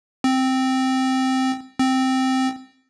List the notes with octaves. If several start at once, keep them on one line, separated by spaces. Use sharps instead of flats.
C4
C4